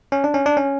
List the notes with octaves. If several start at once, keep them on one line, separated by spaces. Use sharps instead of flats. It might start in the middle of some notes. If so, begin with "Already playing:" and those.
C#4
D4
C#4
D4
C#4